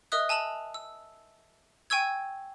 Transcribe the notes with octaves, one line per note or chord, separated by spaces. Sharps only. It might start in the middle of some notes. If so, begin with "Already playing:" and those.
A#4 D#5 E5 D#6 F#6
G#5 A5 E6 D#7 F7 F#7
E6
G5 G#5 C#6 E6 G#6